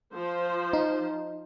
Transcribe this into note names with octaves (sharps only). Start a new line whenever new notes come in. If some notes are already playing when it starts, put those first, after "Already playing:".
F3 C5
D#4